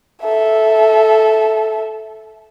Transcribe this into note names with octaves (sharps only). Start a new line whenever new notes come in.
A4 E5